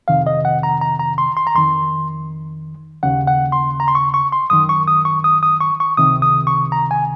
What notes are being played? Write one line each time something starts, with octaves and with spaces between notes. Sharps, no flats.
F2 C3 D#3 F5
D#5
F#5
A#5
A#5
A#5
C6
C6
A#5
F2 D#3 C6
D#2 C#3 F#5
F#5
C6
A#5
C6
C#6
C#6
C6
F#2 D#3 D#6
C#6
D#6
C#6
D#6
D#6
C#6
C#6
C#2 C3 D#3 D#6
D#6
C#6
A#5
G#5